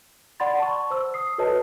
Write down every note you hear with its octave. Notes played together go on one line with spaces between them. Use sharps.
D5 F#5 B5 C6 A6
A5 C#6
C5 E6
D#6 C7
F#4 A4 B4 C#5 D#5 A5